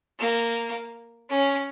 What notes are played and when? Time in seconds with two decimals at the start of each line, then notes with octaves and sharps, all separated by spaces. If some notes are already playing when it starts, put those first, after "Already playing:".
0.19 A#3
1.29 C#4